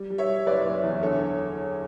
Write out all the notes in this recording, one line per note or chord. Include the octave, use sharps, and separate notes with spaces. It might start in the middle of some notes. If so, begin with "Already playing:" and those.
Already playing: G3
G3
C#5 E5
G3
F#1 B4 D5
F#1
E2
D3 A4 C#5